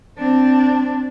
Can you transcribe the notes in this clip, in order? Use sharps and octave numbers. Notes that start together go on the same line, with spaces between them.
C4 D4